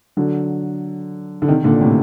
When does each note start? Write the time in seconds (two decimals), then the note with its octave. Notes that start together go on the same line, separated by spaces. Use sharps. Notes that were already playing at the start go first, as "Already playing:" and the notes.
0.17 D3 F#3
1.42 D3
1.48 C3 D#3
1.64 A#2 D3
1.81 A2 C3